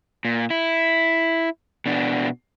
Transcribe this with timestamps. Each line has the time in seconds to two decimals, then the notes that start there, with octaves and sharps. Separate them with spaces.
0.25 A#2
0.50 E4
1.86 B2 D4